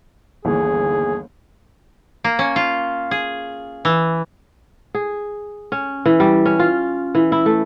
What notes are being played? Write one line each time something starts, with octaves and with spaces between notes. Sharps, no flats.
G1 D#2 E3 G#4
A#3
C#4
F4
G#4
E3
G#4
C#4
E3
G3
C#4
F4
E3
E4
A3